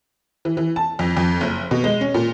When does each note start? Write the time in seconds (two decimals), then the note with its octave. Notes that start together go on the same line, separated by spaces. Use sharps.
0.45 E3
0.57 E3
0.76 A5
0.99 F2
1.17 F2
1.41 F#1
1.71 B2
1.84 G#3
2.01 C#4
2.14 A#2